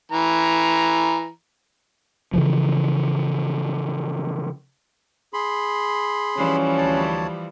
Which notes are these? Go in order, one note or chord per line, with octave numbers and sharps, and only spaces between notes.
E3 A#5
C#3 E3 F3
G#4 B5 C6
E3 F3 G3 C#4
D2 C#5 A5